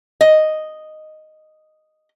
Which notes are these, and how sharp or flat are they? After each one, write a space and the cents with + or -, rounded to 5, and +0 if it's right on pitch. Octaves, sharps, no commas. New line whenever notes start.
D#5 -5